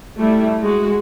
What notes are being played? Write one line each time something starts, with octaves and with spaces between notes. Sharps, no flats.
G3 A3 E4
G#3 F#4